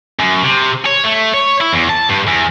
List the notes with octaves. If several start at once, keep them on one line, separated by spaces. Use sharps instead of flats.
F#2
C3
C#5
A3
C#5
E4
E2
A5
G2
E2